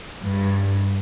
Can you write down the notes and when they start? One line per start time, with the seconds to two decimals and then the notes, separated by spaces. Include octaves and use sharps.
0.24 G2